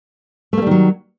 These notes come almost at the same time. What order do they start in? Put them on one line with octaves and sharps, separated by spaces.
A3 A#3 G3 D#3 F#3